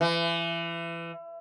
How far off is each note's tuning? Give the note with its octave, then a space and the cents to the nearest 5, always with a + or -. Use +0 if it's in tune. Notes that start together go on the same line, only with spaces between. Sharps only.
E3 +30